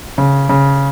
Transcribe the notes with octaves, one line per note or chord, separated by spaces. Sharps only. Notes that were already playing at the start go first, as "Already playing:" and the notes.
C#3
C#3